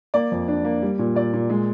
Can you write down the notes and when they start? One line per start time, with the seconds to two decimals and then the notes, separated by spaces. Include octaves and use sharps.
0.14 A#3 D5
0.32 F2
0.48 D4
0.65 A#3
0.82 G3
0.99 A#2
1.15 A#2 D5
1.34 A#2
1.50 G#3